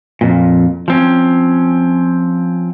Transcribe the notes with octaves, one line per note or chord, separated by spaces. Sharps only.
F2 A#2
F3 C4 C#4